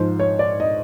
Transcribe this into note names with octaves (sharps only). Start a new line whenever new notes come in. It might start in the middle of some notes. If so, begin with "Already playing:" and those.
Already playing: G#2 F3 C5
C#5
D5
D#5